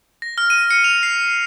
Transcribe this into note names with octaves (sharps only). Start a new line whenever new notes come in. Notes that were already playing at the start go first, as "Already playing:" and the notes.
A#6
F6
D#7
C#7
F7
C7